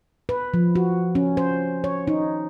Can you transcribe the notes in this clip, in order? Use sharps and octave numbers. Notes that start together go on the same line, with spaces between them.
B4
F3
F#4
C#4
C5
C#5
D#4